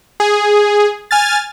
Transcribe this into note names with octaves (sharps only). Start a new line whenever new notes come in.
G#4
G#5 F6 A6